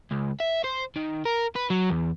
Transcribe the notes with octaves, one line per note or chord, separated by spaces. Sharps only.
C#2
E5
C5
D#3
A#4
B4
F#3
E2